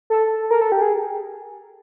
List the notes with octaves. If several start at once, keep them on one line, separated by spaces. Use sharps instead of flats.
A4
A#4
A4
G4
G#4